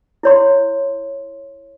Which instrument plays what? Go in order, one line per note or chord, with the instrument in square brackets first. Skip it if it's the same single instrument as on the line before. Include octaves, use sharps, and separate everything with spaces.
[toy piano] E4 C#5 C6